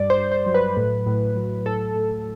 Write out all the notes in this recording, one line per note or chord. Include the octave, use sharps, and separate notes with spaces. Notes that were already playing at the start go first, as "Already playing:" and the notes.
Already playing: G2 G3 D5
C5
G2
C5
F#3
B4
A2
A2
F#3
A2 A4
A2